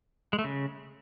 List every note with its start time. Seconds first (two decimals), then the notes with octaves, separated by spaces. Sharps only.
0.33 G#3
0.39 A3
0.44 C#3